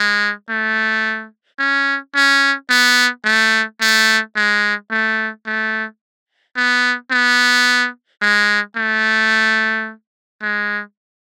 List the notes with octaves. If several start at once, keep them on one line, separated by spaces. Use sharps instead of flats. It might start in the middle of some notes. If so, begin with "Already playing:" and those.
Already playing: G#3
A3
C#4
C#4
B3
A3
A3
G#3
A3
A3
B3
B3
G#3
A3
G#3